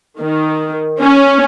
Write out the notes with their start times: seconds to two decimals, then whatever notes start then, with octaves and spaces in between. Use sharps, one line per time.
0.20 D#3
1.01 C#4